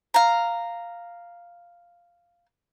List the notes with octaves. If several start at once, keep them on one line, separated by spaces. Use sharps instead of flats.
F5 A#5